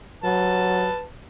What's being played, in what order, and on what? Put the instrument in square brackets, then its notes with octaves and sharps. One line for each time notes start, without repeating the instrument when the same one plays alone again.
[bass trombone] F#3 [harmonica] B4 A5